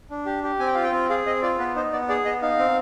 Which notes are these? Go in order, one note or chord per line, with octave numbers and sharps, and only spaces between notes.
D4
G4
G4
C4 G#5
G5
F4 F5
G5
C4
G#4 F5
C4 D#5
F4 D5
B3 B4
D#4 C5
B3 D5
G#4 D5
B3 D#5
D#4 F5
C4